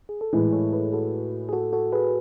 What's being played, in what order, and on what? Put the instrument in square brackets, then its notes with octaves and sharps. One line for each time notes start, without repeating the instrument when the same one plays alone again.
[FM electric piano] G#4
A4
[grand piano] A2 E3 G#3 [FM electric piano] G#4 B4
[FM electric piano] A4 C#5
G#4 B4
F#4 A4
G#4
F#4 A4
F#4 A4
G#4 B4